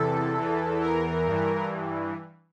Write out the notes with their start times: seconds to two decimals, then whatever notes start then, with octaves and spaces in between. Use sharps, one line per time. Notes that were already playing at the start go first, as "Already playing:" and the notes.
Already playing: E2 C3 E3 A4
0.38 E2 E3
0.81 A#4
1.26 G2 E3